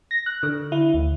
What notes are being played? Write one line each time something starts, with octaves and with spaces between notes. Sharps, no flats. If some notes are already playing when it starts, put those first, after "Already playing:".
A#6
F#6
D3
E4
D2